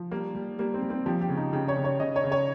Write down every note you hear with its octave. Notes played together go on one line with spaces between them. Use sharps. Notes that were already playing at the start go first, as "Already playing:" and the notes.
Already playing: F3
G3 A#3
G3
G3 A#3
C4
G3
C4
F3 G4
G4
C#3
D#4
C#3 G4
C#5
C#3
C#5
C#3 D#5
C#5
C#3
C#5